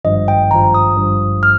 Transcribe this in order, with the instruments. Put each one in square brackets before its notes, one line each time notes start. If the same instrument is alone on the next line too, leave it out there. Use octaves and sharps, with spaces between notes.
[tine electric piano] G#1 G2 F3 [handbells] D#5
[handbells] G5
[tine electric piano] G#1 G2 F3 [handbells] A#5
[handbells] D#6
[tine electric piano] G#1 G2 F3
[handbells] F6